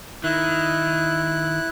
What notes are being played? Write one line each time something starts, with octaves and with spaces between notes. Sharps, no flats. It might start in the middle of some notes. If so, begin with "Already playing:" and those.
D#3 E4 F#6